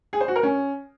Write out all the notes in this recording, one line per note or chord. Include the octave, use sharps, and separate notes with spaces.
G#4
C5
F#4
A#4
C#4